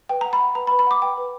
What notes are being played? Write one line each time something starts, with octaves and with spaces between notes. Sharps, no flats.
B4 G5
F#5 A#5
B5
F#5
B4 A#5
B5
B4
B5
F#5 D6
B4 G5
B4